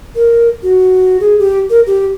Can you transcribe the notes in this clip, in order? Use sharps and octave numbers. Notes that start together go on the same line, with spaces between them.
A#4
F#4
G#4
G4
A#4
G4